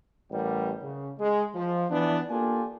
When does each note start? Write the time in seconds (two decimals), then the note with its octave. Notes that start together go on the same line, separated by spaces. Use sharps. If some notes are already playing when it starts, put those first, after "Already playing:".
0.31 A1 A2 G3 G4 A#4 F#5
0.82 C#3
1.19 G#3
1.55 F3
1.90 E3 B3 D4
2.30 A#3 D4 F4 G4 A4 G#5